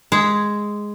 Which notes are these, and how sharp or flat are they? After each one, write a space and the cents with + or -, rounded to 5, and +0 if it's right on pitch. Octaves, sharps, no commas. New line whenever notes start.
G#3 +0 E5 +0